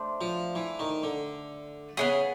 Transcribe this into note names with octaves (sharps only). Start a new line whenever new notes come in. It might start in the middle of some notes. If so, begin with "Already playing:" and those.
Already playing: A3 D4 C5
F3
E3
D#3
D3
C#3 B3 E4 G#4